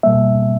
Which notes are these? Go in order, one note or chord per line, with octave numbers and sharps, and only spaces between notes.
B2 G3 A#3 E5